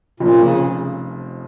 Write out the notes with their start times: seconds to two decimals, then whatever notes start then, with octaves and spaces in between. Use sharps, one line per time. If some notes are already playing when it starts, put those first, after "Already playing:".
0.20 F1 F2 A#2 F3 C#4
0.40 C#3